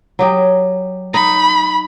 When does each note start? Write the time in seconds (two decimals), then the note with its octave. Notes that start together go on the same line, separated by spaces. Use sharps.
0.19 F#3 G4 D#5
1.14 D#4 B5